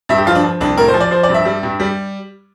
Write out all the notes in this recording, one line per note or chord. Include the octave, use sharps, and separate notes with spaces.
G2 E5
G4
F3 F4
D4
F3
C2 D4
A2 A#4
C5
F3
D5
F3 C5
D5
G2
E5
G3
G2
G3